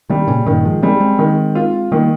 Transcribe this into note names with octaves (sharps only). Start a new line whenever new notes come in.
C3 D#3 G3
A#2 C#3
G2 A#2 D#3
F3 G#3
G3 G#3 C4
G#3 C4
D#3
F4
D#3 G3 A#3